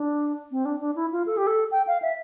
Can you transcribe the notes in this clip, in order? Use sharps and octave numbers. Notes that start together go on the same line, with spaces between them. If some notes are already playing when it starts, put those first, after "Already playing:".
Already playing: D4
C4
D4
D4
E4
F4
A4
G4
A4
G5
F5
E5